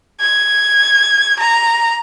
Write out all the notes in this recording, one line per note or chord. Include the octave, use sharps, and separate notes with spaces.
G#6
A#5